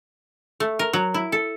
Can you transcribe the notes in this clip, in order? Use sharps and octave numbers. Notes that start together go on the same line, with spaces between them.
A3
A#4
F#3
E4
A4